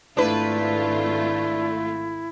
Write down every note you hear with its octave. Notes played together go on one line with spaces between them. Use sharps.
G#1 A3 D4 E4 F4 B4